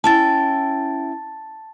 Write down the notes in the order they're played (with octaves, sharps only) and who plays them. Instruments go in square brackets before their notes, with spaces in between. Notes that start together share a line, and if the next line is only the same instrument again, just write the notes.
[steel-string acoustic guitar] C#4 E4 G5 [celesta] A5 A6